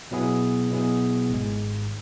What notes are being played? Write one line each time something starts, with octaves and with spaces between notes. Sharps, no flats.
B2 F#3 B3 E4 G#4
B2 F#3 B3 E4 G#4
G#1 G#2 G#3